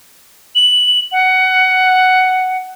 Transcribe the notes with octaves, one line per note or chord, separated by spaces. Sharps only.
F#7
F#5